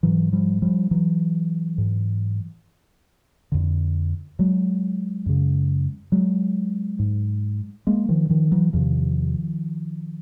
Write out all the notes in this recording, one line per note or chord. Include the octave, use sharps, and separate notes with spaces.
G#2 E3 F#3
F3 G3
F3 G3
E3 F#3
G#2
F2 D3
F#3 G#3
F#2 C#3
F#3 G#3
G#2
G#3 A#3
D#3 F3
D#3 F3
E3 F#3
E2 C3 D#3 F3